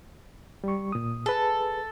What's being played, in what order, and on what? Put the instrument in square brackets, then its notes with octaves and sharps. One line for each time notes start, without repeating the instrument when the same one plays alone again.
[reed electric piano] G3 C#6
A#2 D#6
[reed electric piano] G#4 B4 [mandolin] A4